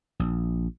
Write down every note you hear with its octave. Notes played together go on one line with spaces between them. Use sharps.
A#1